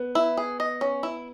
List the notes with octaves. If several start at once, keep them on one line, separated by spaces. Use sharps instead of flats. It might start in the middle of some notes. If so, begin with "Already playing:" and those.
Already playing: B3
E4
G#4
D#5
C#4
E4